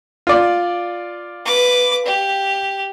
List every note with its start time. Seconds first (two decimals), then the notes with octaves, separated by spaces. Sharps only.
0.27 F4 D5
1.46 B4 D6
2.06 G4